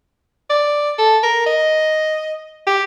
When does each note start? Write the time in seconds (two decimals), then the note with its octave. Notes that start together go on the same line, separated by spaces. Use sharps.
0.50 D5
0.98 A4
1.23 A#4
1.46 D#5
2.67 G4